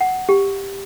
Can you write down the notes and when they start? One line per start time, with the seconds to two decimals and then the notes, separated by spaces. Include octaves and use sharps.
0.01 F#5
0.29 G4